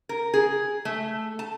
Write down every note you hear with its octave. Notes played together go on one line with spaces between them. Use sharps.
A#4
G#4
A3
A5